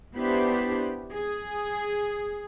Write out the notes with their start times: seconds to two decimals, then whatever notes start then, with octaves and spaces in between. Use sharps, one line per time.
0.16 B3 D4 E4 G4 B4 C5
1.12 G#4